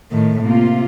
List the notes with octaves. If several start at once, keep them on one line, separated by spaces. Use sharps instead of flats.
A2 D#3
C3 A#3 F4